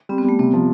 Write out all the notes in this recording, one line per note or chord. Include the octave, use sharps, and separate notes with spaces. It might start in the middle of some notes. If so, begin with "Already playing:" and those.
G3 C4
B3
G3 A3
C3 B3
F3